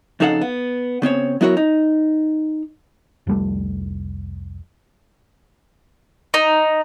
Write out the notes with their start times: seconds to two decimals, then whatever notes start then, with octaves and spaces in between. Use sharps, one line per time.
0.20 F2 C#3 D#4 A4 F5 F#5
0.41 B3
1.02 C#3 B3 C4 C#5
1.41 F#3 B3 E4 F#4 A#4 C#5
1.57 D#4
3.27 F1 C2 G3 A3
6.34 D#4